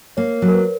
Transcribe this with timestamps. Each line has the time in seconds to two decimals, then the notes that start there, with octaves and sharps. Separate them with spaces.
0.17 A#3 C#5
0.42 F#3
0.48 A#4
0.54 B4